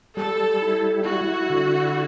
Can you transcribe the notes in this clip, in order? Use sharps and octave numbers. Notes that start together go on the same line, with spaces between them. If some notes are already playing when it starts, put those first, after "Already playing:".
G3 A4
E4
E4 F#4
D3